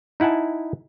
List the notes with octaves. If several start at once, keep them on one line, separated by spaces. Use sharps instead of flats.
D#4 E4 F#5 G#5 A5